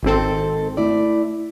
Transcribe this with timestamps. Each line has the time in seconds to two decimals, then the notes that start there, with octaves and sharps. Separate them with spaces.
0.03 G#1 D#3 C4 A4
0.77 A3 E4 D5